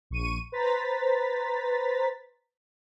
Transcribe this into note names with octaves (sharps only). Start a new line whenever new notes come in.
A#1 C#6 D#7
B4 C5 A#5 A6 B6